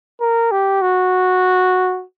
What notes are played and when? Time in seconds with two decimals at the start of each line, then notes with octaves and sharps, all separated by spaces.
0.21 A#4
0.51 G4
0.81 F#4